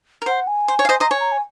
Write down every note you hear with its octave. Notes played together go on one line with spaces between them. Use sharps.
A#4
C5 F#5
G#5
C5
C#5
F5
C5 D#5
C5 D#5 A#5
C#5 G#5
A#5
G#5